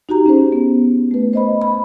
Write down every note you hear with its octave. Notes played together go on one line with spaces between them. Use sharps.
D#4 F#4 G4 A#5
C#4 G#4 C5
B3
A3 B4
C5 D#5 B5
B5